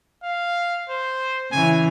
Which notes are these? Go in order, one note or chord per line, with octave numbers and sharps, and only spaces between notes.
F5
C5
C#3 E3 G#5